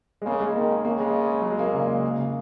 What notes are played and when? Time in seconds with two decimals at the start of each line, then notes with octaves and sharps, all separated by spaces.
0.22 G#3
0.26 C#3 A#3
0.40 G#3
0.55 D#3 A#3
0.85 C#3 A#3
1.00 G#3
1.41 F#3
1.51 G#3
1.59 A#3
1.74 A#2 C#3
2.03 G#2
2.17 C#3